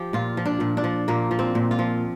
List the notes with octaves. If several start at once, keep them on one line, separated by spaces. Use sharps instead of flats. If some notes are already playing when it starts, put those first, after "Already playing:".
Already playing: F3 G4
A#2 F4
F3
D4
A#2
D4
F3
A#2 A#3
F3
C4
A#2
F4
F3